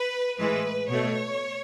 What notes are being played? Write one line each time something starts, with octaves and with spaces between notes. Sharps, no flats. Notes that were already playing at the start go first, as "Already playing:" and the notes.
Already playing: B4
A2 E3 G#3 B4
B2 A3 C#5